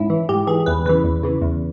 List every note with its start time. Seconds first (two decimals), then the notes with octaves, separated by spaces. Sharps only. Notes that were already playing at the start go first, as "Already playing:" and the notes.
Already playing: G#2 C#4 E4
0.10 E3
0.29 G#2 G4
0.47 E3 G#4
0.66 E2 B4
0.86 C#3 E3 B4
1.04 E2
1.23 C#3 E3
1.41 E2